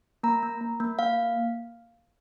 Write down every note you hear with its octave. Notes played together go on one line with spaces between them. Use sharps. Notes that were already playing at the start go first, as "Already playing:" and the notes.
A#3 A#5
A#3
A#3
A#3
A#3 F5